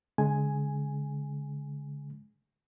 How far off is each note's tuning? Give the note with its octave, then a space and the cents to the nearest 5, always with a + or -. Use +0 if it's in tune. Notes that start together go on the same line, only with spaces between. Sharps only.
D3 -35 G#3 +15 G#5 +0